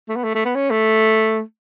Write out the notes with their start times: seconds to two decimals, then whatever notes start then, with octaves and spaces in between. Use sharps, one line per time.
0.09 A3
0.16 B3
0.24 A3
0.35 A3
0.45 B3
0.55 C#4
0.71 A3